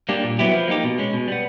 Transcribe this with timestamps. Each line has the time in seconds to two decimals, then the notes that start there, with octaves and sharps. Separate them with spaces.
0.09 G3 A#3 D4 G4
0.24 A#2
0.39 F#3 B3 E4 G4
0.54 F3
0.68 A#3 D#4 G4
0.84 B2
0.98 G#3 C#4
1.13 B2
1.28 G3 B3